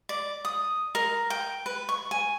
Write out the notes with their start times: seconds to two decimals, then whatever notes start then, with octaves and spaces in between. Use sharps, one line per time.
0.09 D5
0.45 D#6
0.95 A#4
1.30 G5
1.66 B4
1.89 C#6
2.11 G#5